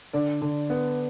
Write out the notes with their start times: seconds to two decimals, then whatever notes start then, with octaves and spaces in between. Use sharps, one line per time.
0.13 D3 D5
0.42 D3
0.70 B3